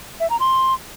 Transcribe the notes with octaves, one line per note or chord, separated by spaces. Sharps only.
E5
A#5
C6